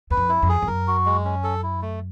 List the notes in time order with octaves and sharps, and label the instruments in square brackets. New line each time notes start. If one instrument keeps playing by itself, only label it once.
[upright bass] E2 [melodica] B4
[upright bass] F2
[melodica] E4
[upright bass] F2
[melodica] G#4
[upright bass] F2
[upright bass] F#2 [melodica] A#4
[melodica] F#4
G#3
C#4
A4
E4
A3